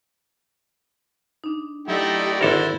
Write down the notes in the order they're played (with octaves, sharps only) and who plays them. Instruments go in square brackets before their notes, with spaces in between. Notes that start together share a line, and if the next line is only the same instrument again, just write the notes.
[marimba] D4 D#4
[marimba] F#3 [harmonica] A3 D#4 E4 [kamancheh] G4 D5
[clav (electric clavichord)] G#1 A4 A#4 [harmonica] D3 C5 [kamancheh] E4